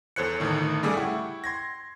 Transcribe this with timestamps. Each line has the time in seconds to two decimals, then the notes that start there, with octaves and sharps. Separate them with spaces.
0.16 E2 A4 C5 C#5 F#6 C#7
0.40 G1 A2 D#3
0.83 C#3 G3 A3 G#4 D6 E6
0.97 E4 F#5 G5 C#6
1.44 C6 G#6 A#6